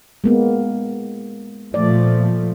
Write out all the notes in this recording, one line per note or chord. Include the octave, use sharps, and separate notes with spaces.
G#3 A#3 B3
A#2 F3 A3 D5